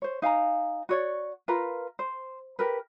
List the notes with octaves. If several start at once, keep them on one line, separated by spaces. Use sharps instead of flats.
C5 C#5
D#4 F5 G#5 A#5
F#4 C#5 D5
F4 A#4 B4 A#5
C5
G4 A#4 B4